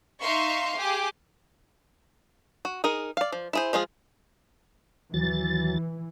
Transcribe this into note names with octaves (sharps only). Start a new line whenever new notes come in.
D#4 E5 F5 C6 C#6
G4 G#4 D6
F#4
D#4 G#4 A#4
D5 F5
F3
E4 G#4 C5
F3 G#3 F4 G#4
D#2 E3 F#3 A6